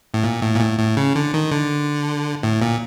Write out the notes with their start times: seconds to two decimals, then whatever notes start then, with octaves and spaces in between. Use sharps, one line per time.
0.14 A2
0.24 A#2
0.42 A2
0.56 A#2
0.61 A2
0.79 A2
0.97 C#3
1.15 D3
1.34 D#3
1.52 D3
2.43 A2
2.62 A#2